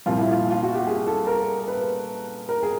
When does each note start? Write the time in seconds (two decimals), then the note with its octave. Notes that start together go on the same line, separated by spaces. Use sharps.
0.06 C2 A#2 F3 F4
0.19 E4
0.32 F4
0.50 F4
0.63 F#4
0.74 G4
0.87 G#4
1.07 A4
1.27 A#4
1.68 B4
2.49 A#4
2.63 G#4